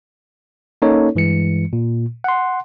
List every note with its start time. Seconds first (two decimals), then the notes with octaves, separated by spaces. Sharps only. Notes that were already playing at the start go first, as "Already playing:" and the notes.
0.82 A#3 C#4 D#4 A4 C#5
1.15 G2 E3 G#3 C#7
1.73 A#2
2.24 F#5 C6